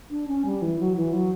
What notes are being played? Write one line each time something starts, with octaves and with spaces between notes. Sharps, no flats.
D4
C#4
G3
E3
F#3
E3
F#3